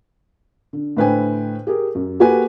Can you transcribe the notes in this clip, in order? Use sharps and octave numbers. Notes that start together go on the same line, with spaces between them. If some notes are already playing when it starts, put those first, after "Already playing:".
D3
A2 D3 B4 C5 G5 G#5
G4 G#4 A#4
F#2
A#3 F#4 G4 A4 B4 G#5